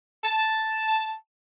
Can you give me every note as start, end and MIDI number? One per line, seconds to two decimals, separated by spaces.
0.24 1.13 81